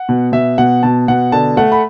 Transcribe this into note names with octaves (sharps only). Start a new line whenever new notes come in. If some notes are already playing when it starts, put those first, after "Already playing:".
Already playing: F#5
B2
B2 E5
B2 F#5
B2 A5
B2 F#5
D3 A5
A3 F#5
B5